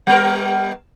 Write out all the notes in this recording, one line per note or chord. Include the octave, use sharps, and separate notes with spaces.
G3 B3 A#4